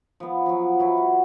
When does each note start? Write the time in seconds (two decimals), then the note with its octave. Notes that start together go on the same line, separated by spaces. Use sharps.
0.20 F3 B3
0.46 F3 F#3
0.79 E3 F#3 E4
0.97 F#4